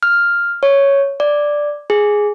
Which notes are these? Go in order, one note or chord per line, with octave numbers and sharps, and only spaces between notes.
F6
C#5
D5
G#4